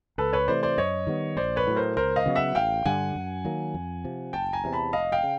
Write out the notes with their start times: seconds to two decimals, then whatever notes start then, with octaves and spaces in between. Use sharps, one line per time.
0.18 C#2 A4 B4
0.33 B4 C#5
0.48 C3 E3 A3 C5 D5
0.63 C5 D5
0.77 F#2 C#5 D#5
1.07 D#3 G3 B3
1.37 A#1 C5 D5
1.56 B4 C#5
1.67 A2 F#3
1.76 A#4 C5
1.97 C#2 A#4 C5
2.16 D#5 F5
2.26 C#3 F#3 B3
2.35 E5 F#5
2.55 A1 F5 G5
2.85 G2 D3 G3 F#5 G#5
3.16 F#2
3.45 D#3 F#3 A#3
3.74 F2
4.04 C3 F3
4.33 F#1 G5 A5
4.53 G#5 A#5
4.64 E2 C3
4.73 A5 B5
4.93 F1 D#5 F5
5.12 F5 G5
5.23 C#3